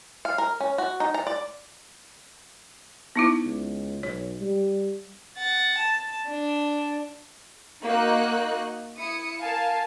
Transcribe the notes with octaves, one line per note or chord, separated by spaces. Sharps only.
F5
A#4
C#4
F#4
D#4
A#5
D5
B3 D#4 E4
C#2
B1 C#5
G3
F#5 A6
A5
D4
A#3 D#4 F#4 D#5 F#6
E4 D#6 C#7
A#4 F5 G#5 A5